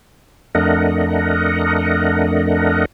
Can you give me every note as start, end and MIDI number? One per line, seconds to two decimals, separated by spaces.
0.55 2.85 41
0.55 2.85 57
0.55 2.85 62
0.55 2.85 70
0.55 2.85 75
0.55 2.85 78